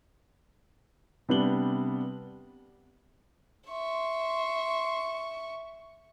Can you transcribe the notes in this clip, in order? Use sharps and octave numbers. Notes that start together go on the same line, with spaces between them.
C3 G3 B3 D4 F#7 G7
E5 C6 C#6